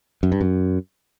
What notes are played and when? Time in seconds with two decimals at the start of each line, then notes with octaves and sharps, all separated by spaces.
0.23 F#2
0.32 G2
0.41 F#2